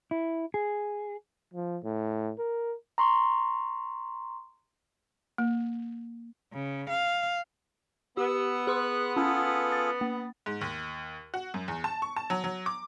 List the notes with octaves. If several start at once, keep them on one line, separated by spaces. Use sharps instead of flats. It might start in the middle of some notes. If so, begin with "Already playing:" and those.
E4
G#4
F3
A2
A#4
A#5 C6 C#6
A#3
C#3
F5
B3 G4 E6
G#4 C6 D#6 F#6
C#4 F4 G#4 A4
A6
A#3
G#2
D#2
F#4
F#2
E2
A5
C#6
A5
F#3
F#3
D6